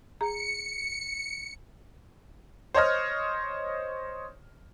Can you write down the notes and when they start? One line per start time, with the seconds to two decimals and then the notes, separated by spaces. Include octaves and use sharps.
0.21 G#4 A#5 C#7
2.75 C5 C#5 D#5 F6